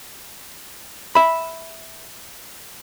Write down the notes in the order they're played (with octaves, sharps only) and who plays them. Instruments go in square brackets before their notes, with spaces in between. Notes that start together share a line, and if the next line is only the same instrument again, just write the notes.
[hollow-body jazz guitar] E5 B5